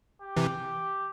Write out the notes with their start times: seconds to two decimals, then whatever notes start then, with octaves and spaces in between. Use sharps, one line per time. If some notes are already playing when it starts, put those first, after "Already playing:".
0.23 G4
0.37 C3 E3